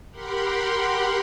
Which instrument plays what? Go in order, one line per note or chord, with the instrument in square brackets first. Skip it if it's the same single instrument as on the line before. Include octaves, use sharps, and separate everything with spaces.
[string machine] G4 A#4 F#5 B5 C6